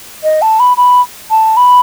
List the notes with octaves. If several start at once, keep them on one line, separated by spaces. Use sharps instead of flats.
D#5
A5
B5
B5
A5
B5